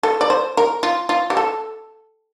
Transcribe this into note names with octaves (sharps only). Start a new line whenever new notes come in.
A4
D5
C5
A#4
F4
F4
G4
A4